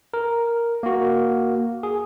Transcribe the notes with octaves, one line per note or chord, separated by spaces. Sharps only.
A#4
A#3 F#4
G#4